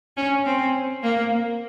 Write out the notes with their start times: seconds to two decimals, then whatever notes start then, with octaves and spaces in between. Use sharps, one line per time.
0.17 C#4
0.45 C4
1.03 A#3